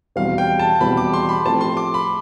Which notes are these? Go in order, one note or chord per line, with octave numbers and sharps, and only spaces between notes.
E2 B2 G3 C4 F5
G5
A5
E2 B2 G3 C4 B5
D6
C6
B5
A2 F3 A3 C4 G4 A5
C6
D6
B5